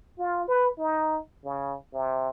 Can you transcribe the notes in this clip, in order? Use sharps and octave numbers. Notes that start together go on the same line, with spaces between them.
F4
B4
D#4
C#3
C3